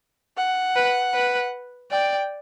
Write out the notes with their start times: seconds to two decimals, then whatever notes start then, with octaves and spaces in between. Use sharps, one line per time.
0.37 F#5
0.76 B4
1.14 B4
1.91 D5 G5